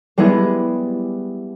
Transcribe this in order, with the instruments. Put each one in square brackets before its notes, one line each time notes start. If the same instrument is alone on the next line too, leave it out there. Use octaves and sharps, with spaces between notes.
[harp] G3 G#3 B3 E4 G#4